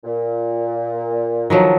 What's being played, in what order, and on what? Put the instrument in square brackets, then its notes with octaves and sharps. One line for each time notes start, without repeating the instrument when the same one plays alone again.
[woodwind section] A#2
[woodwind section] D3 [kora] D#3 F3 F#3